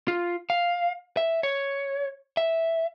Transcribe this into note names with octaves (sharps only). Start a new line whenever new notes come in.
F4
F5
E5
C#5
E5